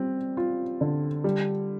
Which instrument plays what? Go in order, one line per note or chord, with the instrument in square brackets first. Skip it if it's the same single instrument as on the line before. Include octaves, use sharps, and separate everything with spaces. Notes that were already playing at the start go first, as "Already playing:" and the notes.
Already playing: [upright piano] G3 C4
F4
D3
G3